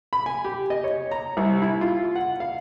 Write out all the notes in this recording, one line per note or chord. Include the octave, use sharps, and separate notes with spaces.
B5
G#5
G4
D#5
C#5
A#5
C2
E4
F4
F#5
F5